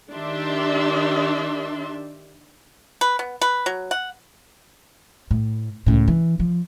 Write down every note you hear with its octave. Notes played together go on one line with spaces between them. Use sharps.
D#3 D4 G4 D5 E5 C6
B4
B3
B4
F#3
F#5
A2
C#2 A2
E3
F3